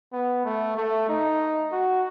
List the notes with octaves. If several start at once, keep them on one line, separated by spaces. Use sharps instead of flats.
B3
A3
A3
D#4
F#4